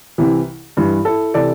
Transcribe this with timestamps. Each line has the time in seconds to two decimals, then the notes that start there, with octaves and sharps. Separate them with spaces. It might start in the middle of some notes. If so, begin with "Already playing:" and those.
0.18 C2 C3 E3
0.77 G2 E3
1.05 E4 A4
1.34 C3 E3 A4 D5